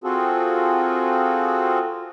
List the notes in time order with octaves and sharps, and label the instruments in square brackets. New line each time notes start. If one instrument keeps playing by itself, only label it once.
[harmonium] C4 F4 F#4 G#4 A4